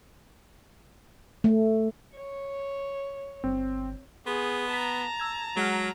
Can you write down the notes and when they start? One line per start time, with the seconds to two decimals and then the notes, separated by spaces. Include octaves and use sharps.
1.44 A3
2.15 C#5
3.44 G1 C4
4.26 B3 G#4 C6
4.73 A5 A#5 B6
5.20 E6 G#6
5.57 F#3 G#3 F#5 F6